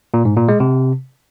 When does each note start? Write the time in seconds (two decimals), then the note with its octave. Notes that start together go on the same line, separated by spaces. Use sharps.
0.14 A#2
0.25 G#2
0.37 A#2
0.48 G#3
0.60 C3